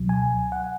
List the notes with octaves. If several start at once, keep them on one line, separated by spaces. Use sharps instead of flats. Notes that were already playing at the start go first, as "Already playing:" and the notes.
Already playing: C#2 B2 F#3
G#5
F#5